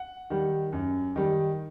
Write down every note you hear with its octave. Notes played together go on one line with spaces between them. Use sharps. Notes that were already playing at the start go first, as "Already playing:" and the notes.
Already playing: F#5
D#3 G3
F#2
D#3 G3